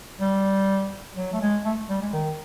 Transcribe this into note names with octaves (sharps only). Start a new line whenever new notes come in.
G3
F#3
A3
G#3
A3
G3
G#3
D#3